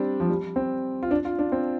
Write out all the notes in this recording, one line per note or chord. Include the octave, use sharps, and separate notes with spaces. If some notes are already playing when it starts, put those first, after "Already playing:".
Already playing: G3 C4 D4
F3
G3
C4
F4
D4
F4
D4
C4